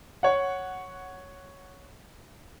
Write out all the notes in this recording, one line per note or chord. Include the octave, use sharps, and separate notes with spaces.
C#5 F#5